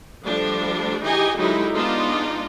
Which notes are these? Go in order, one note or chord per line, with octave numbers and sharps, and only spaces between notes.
F3 G3 A3 D4
E3 D#4 G4 G#4 D#5 G#5
D3 F#3 G#3 D#4 E4 G4
G#3 B3 D4 D#4 F4